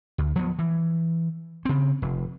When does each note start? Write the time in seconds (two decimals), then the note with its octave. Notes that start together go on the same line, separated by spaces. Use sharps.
0.18 D2
0.36 F3 F#3 A#3 B3
0.59 E3
1.65 C#3 C4
2.02 F1